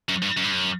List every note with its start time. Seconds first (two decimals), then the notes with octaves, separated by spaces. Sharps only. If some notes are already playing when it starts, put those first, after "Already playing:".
0.09 F#2
0.22 G2
0.37 F#2
0.44 G2
0.51 F#2